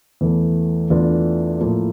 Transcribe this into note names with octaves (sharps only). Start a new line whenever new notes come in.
E2 E3 A3
E2 E3 A3 D4 F4
A2 F3 A#3